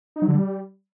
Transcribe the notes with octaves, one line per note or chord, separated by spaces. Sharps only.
D#4
F#3
D3
G3